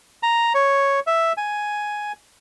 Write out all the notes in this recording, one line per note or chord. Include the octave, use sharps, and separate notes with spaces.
A#5
C#5
E5
G#5